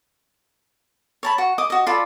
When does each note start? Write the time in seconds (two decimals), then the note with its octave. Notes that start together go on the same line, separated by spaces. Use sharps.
1.23 C#5 A5 B5
1.38 F#4 C#6
1.58 D#5 D6 D#6
1.70 F#4 D#5
1.87 F4 A4 D5 B5